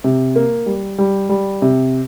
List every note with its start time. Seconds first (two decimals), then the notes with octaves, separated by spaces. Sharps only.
0.04 C3
0.36 A#3
0.66 G3
0.98 G3
1.29 G3
1.62 C3